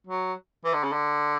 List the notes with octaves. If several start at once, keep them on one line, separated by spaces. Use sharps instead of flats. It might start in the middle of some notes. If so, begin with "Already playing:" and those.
F#3
E3
D3
C#3
D3